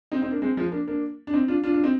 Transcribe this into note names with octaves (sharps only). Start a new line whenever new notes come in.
C4 D#4
C4 D#4
A#3 D4
G#3 C4
F3 G#3
A#3 D4
A#3 D4
D4
C4 D#4
D4 F4
D4 F4
D4 F4
C4 D#4